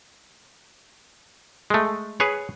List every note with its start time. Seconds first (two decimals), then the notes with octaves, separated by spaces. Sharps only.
1.70 G#3 A3
2.20 G#4 B4 C#5